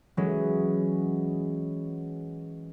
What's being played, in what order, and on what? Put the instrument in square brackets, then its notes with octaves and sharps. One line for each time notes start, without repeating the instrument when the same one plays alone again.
[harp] E3 F#3 G#3 C#4